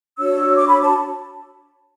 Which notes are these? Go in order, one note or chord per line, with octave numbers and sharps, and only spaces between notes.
D4 F#4 C#5 E6
D6
B5
A5